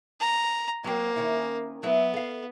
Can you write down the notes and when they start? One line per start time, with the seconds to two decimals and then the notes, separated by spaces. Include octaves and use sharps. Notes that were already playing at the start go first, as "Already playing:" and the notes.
0.21 A#5
0.84 F#3 A#3 C4
1.16 D#3 C#4 E4
1.83 F#3 B3 E4 E5
2.14 A4 F5